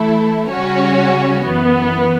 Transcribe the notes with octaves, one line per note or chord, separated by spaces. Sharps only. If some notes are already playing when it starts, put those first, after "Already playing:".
Already playing: E3 A3 E4 A4
C#3 G3 C#4 F#4 C#5
F#2 E3 B3